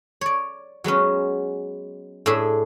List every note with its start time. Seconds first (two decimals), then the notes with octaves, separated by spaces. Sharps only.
0.21 C#5 D5
0.84 F#3 G#3 B3 C#4
2.26 A2 D4 G#4 E5